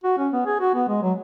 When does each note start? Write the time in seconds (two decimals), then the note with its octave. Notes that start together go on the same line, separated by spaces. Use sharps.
0.04 F#4
0.18 C#4
0.33 B3
0.46 G#4
0.60 F#4
0.74 B3
0.88 G#3
1.02 F#3